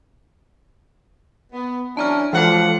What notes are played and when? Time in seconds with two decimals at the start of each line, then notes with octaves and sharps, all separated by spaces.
1.52 B3
1.97 E3 F#3 C#4 D4 A5 A#5 F6
2.33 E3 F3 G#3 F4 F#4 A4 F#5